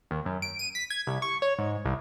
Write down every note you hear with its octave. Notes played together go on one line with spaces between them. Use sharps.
D#2
F#2
D7
D#7
B6
G#6
C2
C#6
C#5
G#2
C2